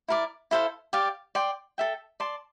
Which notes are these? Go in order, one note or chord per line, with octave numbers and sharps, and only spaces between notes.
E4 A#4 D5
E4 A4 C5 F5
G4 D5 F5
D5 G5 C6
A4 E5 G5
D5 A5 C6